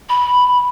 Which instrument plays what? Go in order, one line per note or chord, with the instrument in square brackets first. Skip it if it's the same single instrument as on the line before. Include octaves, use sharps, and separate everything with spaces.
[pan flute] B5